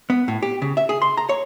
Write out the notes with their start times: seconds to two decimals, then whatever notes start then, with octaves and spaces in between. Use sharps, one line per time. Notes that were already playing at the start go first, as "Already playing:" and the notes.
0.10 B3
0.28 A2
0.43 G4
0.62 C#3
0.77 E5
0.89 G#4
1.02 C6
1.17 A#5
1.29 C#5